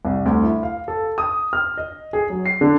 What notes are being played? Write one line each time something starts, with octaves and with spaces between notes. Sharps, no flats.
C2
D2
E4
F5
A4
D#6
F6
D#5
G#4
F#3
C7
D3